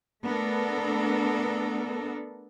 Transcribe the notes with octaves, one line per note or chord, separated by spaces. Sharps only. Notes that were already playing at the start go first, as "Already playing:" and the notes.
A3 B3 D4 A4 A#4